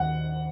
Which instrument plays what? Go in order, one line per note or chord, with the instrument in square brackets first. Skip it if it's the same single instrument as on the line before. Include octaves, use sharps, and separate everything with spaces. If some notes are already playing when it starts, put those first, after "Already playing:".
Already playing: [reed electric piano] D#2 D#3 F#3 [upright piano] F#5